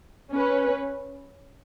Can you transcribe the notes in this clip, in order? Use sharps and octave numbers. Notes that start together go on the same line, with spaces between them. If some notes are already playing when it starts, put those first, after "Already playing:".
C#4 B4